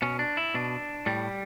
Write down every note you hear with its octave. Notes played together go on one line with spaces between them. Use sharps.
B2 C#4
D4
E4
B2 D4
A2 G3